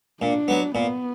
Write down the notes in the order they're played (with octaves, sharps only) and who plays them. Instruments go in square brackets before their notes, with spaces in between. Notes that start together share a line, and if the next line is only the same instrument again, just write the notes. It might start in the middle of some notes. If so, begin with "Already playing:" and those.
[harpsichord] A#2 [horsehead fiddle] D4
[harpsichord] F#3 B3
[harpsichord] A#2 [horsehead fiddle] B3